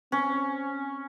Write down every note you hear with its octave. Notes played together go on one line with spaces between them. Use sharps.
C4 C#4